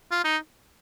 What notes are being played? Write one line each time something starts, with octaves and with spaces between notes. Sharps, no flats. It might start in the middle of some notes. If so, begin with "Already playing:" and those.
F4
D#4